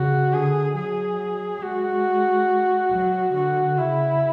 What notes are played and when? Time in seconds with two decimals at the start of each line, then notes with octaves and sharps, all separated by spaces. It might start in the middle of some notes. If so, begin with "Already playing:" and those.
Already playing: C#3 F#4
0.33 D3 G#4
0.76 F#3 G#4
1.62 G#3 F#4
2.92 F#3
3.34 D3 F#4
3.78 C#3 E4